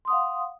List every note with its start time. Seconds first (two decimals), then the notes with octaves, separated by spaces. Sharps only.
0.05 C6
0.08 D#6
0.10 F#5
0.13 F5